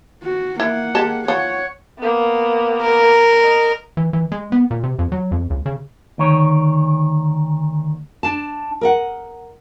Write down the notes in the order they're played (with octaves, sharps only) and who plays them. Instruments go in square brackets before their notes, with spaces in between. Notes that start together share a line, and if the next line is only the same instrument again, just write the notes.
[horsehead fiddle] F#4
[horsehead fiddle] A#3 F#5 [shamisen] E4
[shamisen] G#3 G4 A5
[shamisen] F3 [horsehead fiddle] C#5 F#5
[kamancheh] A#3 B3
[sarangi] A#4
[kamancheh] D#5
[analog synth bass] E3
E3
G#3
B3
A#2
C3
F2
F#3
F2
C#2
C#3
[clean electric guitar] D2 D#3 C#5
[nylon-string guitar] D4 A5
A#4 D#5 F#5